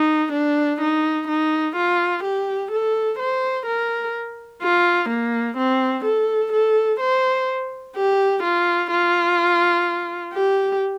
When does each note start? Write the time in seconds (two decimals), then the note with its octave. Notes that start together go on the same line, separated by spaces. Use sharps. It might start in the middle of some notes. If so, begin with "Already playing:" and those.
Already playing: D#4
0.33 D4
0.81 D#4
1.28 D#4
1.76 F4
2.24 G4
2.71 A4
3.19 C5
3.66 A#4
4.62 F4
5.09 A#3
5.57 C4
6.05 A4
6.53 A4
7.00 C5
7.96 G4
8.43 F4
8.91 F4
10.33 G4